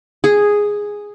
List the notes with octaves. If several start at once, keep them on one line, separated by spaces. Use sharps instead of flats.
G#4